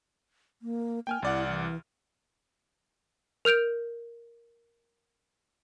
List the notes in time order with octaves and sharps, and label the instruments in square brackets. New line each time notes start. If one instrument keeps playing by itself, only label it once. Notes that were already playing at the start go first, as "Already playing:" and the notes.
[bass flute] A#3
[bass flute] A#3 [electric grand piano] G5 G#5 F6
[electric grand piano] C2 D5 F#5 [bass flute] E4
[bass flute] E3
[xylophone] A#4 F6 G6 D7 F7